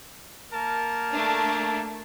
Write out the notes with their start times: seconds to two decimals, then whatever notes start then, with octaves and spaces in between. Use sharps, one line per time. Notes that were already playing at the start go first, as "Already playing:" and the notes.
0.53 A#3 A#4 A5
1.11 A3 D4